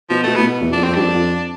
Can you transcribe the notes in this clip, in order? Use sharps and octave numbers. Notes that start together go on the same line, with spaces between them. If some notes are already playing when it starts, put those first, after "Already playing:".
B2 F3
B2 A3
A2 B3
B2
E2
F2 D4
F2 C4
G2 D4
F2
F2